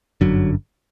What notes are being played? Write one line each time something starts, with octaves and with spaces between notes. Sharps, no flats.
G1 F#2 D3 F#3